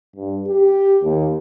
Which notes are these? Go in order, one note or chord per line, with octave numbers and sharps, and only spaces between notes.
G2
G4
D#2